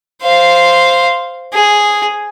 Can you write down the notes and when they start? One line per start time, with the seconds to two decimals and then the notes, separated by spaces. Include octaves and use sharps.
0.22 C5 F5
1.54 G#4